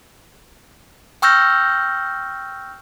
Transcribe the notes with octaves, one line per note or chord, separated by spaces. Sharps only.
G5 C#6 E6 F6 G6 A#6